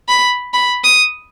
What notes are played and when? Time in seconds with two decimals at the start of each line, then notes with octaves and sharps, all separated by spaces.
0.09 B5
0.54 B5
0.84 D#6